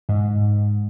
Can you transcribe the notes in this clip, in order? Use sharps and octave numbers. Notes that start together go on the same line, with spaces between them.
G#2